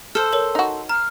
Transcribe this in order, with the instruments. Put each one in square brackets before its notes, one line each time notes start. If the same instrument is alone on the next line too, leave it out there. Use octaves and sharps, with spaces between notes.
[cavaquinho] A4 C5 [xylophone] F6
[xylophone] A#4 C#5
[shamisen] D#4 F#4
[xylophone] A#5 [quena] F6